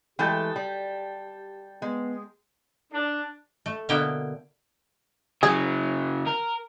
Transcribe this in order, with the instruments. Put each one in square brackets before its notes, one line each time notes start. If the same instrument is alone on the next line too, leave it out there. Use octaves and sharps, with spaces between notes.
[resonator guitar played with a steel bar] E3 G#3 A3 [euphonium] G4 [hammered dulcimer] G5 A5
[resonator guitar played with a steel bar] G3
[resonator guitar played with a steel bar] G#3 [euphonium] B3
[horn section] D4
[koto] A3
B2 D3 A#3 B3 E4 G5
[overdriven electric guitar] C#3 F#3 [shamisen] G#4
[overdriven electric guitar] A#4